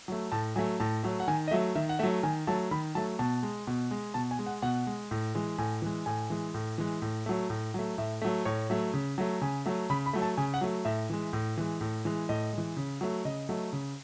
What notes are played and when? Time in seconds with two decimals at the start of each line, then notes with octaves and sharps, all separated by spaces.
0.08 F#3 A3
0.32 A2 A5
0.56 F#3 A3 G#5
0.80 A2 A5
1.03 F#3 A3
1.20 F#5
1.28 D#3 G#5
1.48 D#5
1.51 F#3 A3 E5
1.75 D#3 E5
1.89 F#5
1.99 F#3 A3 E5
2.23 D#3 G#5
2.47 F#3 A3 A5
2.71 D#3 B5
2.95 F#3 A3 A5
3.19 B2 A5
3.43 G#3
3.67 B2
3.91 G#3
4.14 B2 A5
4.31 G#5
4.39 G#3
4.47 F#5
4.62 B2 F#5
4.87 G#3
5.11 A2
5.35 E3 G#3
5.58 A2 G#5
5.82 E3 G#3
6.06 A2 G#5
6.30 E3 G#3
6.54 A2
6.78 E3 G#3
7.02 A2
7.26 F#3 A3
7.50 A2
7.74 F#3 A3
7.98 A2 E5
8.22 F#3 A3
8.45 A2 C#5
8.70 F#3 A3
8.94 C#3
9.18 F#3 A3
9.41 C#3 G#5
9.66 F#3 A3
9.90 C#3 B5
10.06 B5
10.13 F#3 A3
10.22 A5
10.37 C#3 G#5
10.54 F#5
10.61 F#3 A3
10.85 A2 E5
11.10 E3 G#3
11.33 A2
11.58 E3 G#3
11.81 A2
12.05 E3 G#3
12.29 A2 D#5
12.53 E3 G#3
12.77 C#3
13.01 F#3 A3
13.25 C#3 D#5
13.49 F#3 A3
13.73 C#3